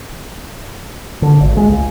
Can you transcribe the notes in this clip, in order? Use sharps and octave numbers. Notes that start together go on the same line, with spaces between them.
D3
G#1
G#3
C#2